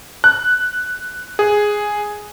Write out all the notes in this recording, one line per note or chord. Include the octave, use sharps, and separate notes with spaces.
F#6
G#4